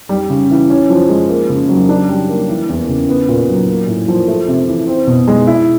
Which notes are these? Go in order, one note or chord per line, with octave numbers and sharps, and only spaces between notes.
G3
C#3
E3
C#4
F3
G#3
A#3
C#3
F#3
D4
G3
A#3
E3
E2
C#3
B3
A#2
F#3
A#3
A2
F3
A3
C3
E3
C4
B2
G#3
E4